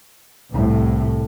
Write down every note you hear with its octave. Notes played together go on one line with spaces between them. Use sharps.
C2 A2